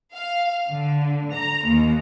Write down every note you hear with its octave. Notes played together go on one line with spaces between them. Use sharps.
F5
D3
A#5
D#2